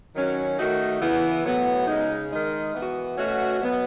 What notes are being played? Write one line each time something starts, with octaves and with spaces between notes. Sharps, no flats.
D#3 F#3 C#4 F#4
D#3 A3 D#4 F#4
C#3 E3 B3 E4
A2 F#3 B3 F#4
C#3 G#3 D#4
D#3 G#3 D#4
E3 B3 F#4
B2 A3 C#4 F#4
B2 F#3 B3